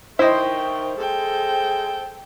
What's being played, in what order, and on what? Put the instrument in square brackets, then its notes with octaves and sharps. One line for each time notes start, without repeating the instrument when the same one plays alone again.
[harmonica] D#3 E5 C#6 [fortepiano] E4 D#5 [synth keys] C5 [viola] G5
[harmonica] G#3 [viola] A4 G5